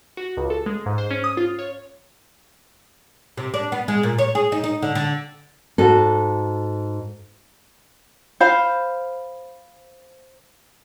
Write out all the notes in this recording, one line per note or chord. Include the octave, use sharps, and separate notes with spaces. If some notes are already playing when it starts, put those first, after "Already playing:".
F#4
C#2
A4
G#3
G#2
C5
C#4
D#6
F4
C#5
C3
D4
B3
G#3
A#2
C#5
G#4
D#4
D#4
D3
D3
G#2 F#4 A4
C5 F5 B5